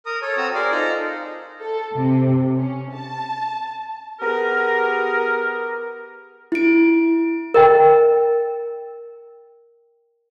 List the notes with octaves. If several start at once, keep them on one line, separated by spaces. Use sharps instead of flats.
A#4 A#5 D#6
A4 C#5
C4 F#4 A#5 D#6 E6
G#4 A#4 C5 D5 F5
D#4 F4 A4 C5 A#5
A4
C3
C#4
A5
B3 G4 G#4 A#4
E4 D7
A#4 D#5 G5